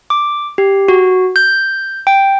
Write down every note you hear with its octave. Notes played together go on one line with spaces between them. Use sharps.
D6
G4
F#4
G6
G5